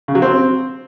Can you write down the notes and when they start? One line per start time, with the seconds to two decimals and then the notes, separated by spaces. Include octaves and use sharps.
0.08 C#3
0.15 F#3
0.22 C4